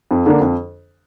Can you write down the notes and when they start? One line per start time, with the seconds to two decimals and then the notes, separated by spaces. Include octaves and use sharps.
0.11 F2
0.26 D3 A#3 D4
0.40 F2